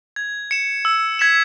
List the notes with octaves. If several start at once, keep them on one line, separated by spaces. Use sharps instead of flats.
G#6
C#7 E7
E6
G#6 B6 E7